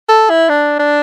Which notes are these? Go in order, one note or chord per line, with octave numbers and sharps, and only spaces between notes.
A4
E4
D4
D4